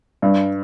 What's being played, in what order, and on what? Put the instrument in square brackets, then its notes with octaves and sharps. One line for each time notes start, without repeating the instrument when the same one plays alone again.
[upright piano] G2